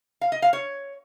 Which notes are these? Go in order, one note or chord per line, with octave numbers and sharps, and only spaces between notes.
F5
D#5
F5
C#5